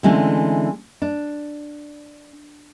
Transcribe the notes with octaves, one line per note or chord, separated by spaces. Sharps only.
D3 E3 G#3 A3 C4 C#4
D4